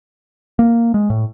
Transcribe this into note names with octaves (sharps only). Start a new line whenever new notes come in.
A#3
G#3
A2